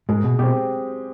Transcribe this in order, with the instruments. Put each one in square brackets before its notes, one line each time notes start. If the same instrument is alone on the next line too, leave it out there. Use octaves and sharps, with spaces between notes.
[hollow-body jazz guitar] G#2 [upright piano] G#3
[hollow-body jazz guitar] B2
[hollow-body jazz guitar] B2 [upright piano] C4 G4